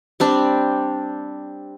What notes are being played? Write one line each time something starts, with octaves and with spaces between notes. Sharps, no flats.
G3 C4 D4